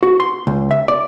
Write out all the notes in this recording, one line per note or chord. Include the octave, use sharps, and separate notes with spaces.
F#4
C6
C#2
E5
D5